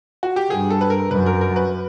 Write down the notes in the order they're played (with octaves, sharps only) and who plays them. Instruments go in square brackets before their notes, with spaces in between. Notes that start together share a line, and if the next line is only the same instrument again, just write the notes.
[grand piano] F#4
G4
[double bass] G2 [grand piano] G#4
[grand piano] A4
B4
A#4
[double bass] F#2 [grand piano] B4
[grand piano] A#4
A#4
B4